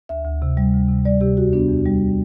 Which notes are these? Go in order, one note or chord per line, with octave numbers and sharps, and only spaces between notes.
D2 E5
D2
C3
G3
D2
C3
G3 D5
C3 G4
E2 F#4
B3 D4
E2
G3